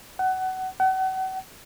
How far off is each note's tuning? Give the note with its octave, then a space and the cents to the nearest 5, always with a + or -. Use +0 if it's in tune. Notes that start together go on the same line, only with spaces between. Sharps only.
F#5 +20
F#5 +35